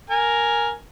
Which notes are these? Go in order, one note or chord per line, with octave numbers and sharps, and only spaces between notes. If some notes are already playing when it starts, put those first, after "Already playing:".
A#4 G#5